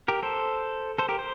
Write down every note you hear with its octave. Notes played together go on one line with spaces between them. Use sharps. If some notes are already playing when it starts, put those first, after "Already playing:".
G4 A#4
A4 C5
A4 C5
G4 A#4
C5